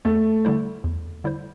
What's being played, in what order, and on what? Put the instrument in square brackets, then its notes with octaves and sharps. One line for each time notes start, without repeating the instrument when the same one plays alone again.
[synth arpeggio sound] E2 [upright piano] A3
[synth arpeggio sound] D3 G3 E4 C5
E2
D3 G3 E4 C5